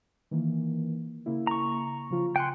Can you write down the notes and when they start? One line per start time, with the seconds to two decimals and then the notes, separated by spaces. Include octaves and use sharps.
0.31 D#3 E3 A#3
1.26 C#3 A#3 E4
1.47 A#5 C#6
2.11 C#3 F3 F4
2.36 G5 G#5 C6 F#6 C#7